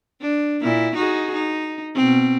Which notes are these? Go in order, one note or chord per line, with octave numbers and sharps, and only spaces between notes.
D4
A#2 E4
D#4 F#4 G#4
D#4
B2 C4